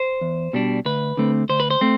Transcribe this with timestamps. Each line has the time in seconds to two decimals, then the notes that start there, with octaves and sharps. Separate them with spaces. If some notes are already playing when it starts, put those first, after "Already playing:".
Already playing: C5
0.21 E2
0.53 B2 G3 D4
0.85 D2 B4
1.17 D3 A3 C4
1.49 D2 C5
1.60 B4
1.70 C5
1.81 A3 C4